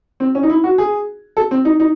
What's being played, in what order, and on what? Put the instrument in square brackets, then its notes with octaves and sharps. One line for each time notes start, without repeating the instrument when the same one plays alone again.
[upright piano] C4
C#4
D#4
E4
F#4
G#4
A4
C4
D#4
D#4